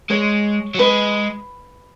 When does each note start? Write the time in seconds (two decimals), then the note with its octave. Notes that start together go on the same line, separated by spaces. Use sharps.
0.10 G#3 C#5
0.75 F#3
0.79 G#3 B4